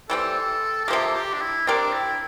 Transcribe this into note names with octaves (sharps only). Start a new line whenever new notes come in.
E3 G3 C4 A4
A4
C3 F3 A#3 G4
A4
G4
D4
E4
C4 D4 G4 A#4 D5
E4